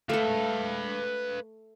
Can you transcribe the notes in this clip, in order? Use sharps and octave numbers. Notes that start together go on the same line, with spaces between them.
A3 A4 B4 F5